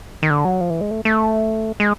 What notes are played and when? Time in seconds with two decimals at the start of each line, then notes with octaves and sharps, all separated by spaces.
0.23 D#3
0.30 D3
0.45 F#3
0.61 F3
0.70 E3
0.81 G#3
0.91 A3
1.05 A3
1.80 G#3